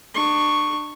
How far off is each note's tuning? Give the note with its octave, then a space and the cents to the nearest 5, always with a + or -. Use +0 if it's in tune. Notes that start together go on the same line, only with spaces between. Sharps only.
D4 +35 C#6 +0